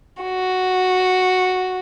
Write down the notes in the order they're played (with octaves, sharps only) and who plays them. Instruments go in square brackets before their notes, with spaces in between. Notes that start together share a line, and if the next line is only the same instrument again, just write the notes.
[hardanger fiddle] F#4